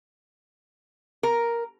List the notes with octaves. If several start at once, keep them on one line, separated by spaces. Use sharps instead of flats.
A#4